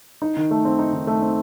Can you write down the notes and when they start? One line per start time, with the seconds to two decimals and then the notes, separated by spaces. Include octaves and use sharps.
0.22 D#4
0.36 D#3
0.51 A3
0.65 C4
0.79 D#4
0.93 D#3
1.07 A3
1.22 C4